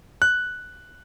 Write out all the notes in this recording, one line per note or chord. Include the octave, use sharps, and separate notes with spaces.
F#6